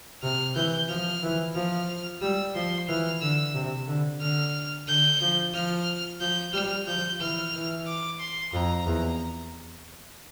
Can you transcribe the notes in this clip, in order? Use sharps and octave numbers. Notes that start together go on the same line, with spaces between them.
C3 F6
E3 G6
F3 F6
E3
F3 F6
G3 E6
F3 C6
E3 F6
D3 E6
C3
D3
D3 F6
D3 G6
F3
F3 F6
F3 G6
G3 F6
F3 G6
E3 F6
E3
D6
C6
F2 A#5
E2